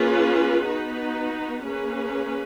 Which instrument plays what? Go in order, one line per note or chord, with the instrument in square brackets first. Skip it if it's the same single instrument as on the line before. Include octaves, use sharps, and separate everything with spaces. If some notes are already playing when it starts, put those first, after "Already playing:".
Already playing: [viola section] A#3 C#4 F4 G#4 B4
B3 D#4 F#4 B4
A#3 C#4 G#4 B4